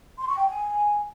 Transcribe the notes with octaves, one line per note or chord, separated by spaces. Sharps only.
C6
C#6
G5
G#5